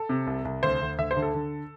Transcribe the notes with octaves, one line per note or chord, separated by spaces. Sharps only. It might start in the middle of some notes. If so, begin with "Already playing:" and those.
Already playing: A4
C3
C2
C2
D2 C5
D2
D2 E5
C5
D3
A4
D3